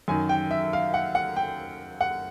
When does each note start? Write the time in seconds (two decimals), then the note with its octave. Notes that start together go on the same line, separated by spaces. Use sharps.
0.08 F#2 D#3 G#5
0.29 G5
0.51 E5
0.73 F5
0.94 F#5
1.15 F#5
1.36 G5
2.01 F#5